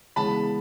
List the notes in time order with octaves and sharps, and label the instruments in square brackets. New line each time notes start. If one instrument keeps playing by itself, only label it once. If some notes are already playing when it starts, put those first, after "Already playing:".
[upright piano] C#3 E3 G#3 B3 E4 [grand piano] A5 B5